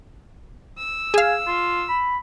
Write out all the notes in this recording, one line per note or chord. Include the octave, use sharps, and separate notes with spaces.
E6
G#4 F5 G#5
F4
B5